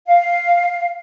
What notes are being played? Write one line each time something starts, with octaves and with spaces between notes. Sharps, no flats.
F5